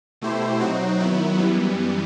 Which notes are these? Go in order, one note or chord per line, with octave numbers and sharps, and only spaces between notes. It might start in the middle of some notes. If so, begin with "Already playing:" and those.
B2 A3 E4 G4 C5
F#3 C4 D#4 F#4
D#3 F#3 B3 E4
F#2 E3 G3 B3